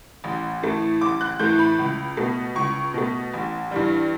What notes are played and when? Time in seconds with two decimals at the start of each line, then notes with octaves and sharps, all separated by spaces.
0.24 A1
0.63 A2 E3 A3
1.01 A1 D6
1.21 F#6
1.39 A2 E3 A3 G6
1.59 B5
1.79 C#2
2.17 B2 A3
2.55 C#2 C#6
2.94 B2 A3
3.33 A1
3.71 G2 E3 G3